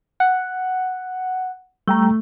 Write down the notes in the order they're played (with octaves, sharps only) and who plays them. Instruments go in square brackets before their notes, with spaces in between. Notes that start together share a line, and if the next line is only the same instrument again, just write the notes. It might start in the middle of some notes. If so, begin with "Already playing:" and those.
[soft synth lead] F#5
[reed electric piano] G3 G5 A#5 [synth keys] A3